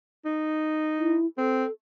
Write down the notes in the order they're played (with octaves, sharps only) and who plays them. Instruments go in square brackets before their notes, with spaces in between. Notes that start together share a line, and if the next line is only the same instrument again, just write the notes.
[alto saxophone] D#4
[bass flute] E4
[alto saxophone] C4 [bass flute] A4